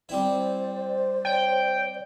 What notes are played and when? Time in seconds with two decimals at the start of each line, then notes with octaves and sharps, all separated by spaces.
0.09 G3 C4 E4 C5 D5
1.25 C#5 G5